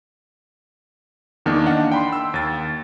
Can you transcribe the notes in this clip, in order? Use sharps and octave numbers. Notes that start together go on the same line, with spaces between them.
E2 D#3 A#3 D4
D4 D#5 F5 F#5
G5 B5 C6
E6
D#2 A6